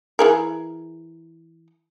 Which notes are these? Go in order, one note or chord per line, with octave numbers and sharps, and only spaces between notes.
E3 G#4 A#4